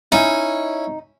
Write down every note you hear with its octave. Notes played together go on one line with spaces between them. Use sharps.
C#4 D#4 E4